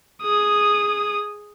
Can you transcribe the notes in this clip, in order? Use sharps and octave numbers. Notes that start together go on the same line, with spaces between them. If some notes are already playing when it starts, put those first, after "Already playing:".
G#4 D#6